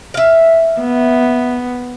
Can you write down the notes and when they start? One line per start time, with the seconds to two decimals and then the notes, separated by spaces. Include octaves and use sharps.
0.14 E5 F5
0.81 B3